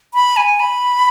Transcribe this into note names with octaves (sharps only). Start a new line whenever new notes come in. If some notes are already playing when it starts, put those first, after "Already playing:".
B5
G#5
B5